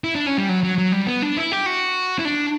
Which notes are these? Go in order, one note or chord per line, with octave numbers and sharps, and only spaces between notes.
E4
D4
C#4
G3
F#3
F#3
F#3
G3
B3
D4
E4
G4
F#4
E4
D4